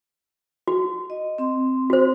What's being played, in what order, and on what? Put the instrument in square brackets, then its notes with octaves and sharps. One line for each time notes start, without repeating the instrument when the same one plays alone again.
[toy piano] F#4
[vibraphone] D#5
C4 C6
[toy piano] F#4 C5